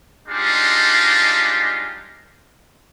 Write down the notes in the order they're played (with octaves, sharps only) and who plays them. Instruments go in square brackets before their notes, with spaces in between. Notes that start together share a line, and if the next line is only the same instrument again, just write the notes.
[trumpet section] G3 G#3 D4 D#4 F4